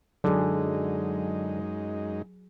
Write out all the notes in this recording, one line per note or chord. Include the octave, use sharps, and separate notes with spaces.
F#2 D3 F#3 G#3 D#4 G#4